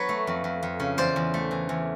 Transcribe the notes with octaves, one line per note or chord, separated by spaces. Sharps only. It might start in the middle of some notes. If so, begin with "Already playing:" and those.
Already playing: F#3 B3 B4 C#5
A3
F2
F2
F2
C#3
E2 C5 D5
E2
A3
E3
E2